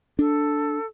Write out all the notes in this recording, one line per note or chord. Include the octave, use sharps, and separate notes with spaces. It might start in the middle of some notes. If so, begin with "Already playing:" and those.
D4 A4